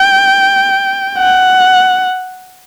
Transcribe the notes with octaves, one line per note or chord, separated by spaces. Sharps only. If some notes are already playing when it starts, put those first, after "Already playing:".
Already playing: G5
F#5